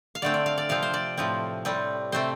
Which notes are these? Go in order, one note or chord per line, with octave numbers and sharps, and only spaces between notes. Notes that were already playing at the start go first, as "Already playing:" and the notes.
F5
D3 A3 C4 D5
D5
F5
D5
C3 F3 C4 F5
C5
D5
A2 F3 C4
A2 G3 C4
C3 A3 C4 C5